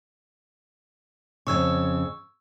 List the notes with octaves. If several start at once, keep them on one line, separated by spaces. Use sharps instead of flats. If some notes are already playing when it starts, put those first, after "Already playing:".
F2 A#2 C#3 C#6 E6 G#6